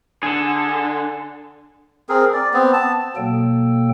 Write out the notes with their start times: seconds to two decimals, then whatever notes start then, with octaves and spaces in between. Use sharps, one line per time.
0.23 D3 G#4 A4 G#5
2.09 C4 G#4 A#4
2.33 D5
2.53 B3 C4
2.73 A5
3.16 B2 F#3 A#3 A4 G5